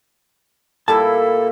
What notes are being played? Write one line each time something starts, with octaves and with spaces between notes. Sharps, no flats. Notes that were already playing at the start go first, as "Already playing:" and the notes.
A#2 G3 E4 A4 A5